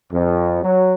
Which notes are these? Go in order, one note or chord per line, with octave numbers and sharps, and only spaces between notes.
F2
F#3